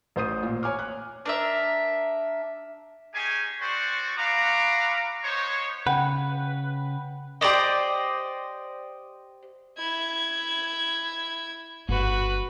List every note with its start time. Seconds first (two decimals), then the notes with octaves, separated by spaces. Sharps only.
0.16 A1 C5 D#6 D#7
0.43 A#2
0.63 C#5 G#5 D6 F6
0.79 F#6
1.26 D4 A#4 E5
3.14 C#4 D#4 G4 G#4 G#5
3.60 C4 F#4 C5 D5 C#6
4.17 F#4 F5 F#5 A#5 B5 D6
5.24 B3 D#4 C5 C#5
5.87 C#3 B4 F#5 G5
7.41 G4 C5 D5 D#5
9.78 E4 G#6
11.89 G1 F#4 B4